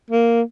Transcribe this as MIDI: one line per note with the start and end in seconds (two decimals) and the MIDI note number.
0.11 0.42 58